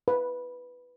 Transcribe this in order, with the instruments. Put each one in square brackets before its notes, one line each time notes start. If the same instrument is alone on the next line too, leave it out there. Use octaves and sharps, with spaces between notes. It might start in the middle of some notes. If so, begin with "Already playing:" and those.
[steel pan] B4